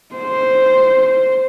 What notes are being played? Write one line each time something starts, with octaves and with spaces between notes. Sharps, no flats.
C5